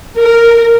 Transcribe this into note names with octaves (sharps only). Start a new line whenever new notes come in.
A#4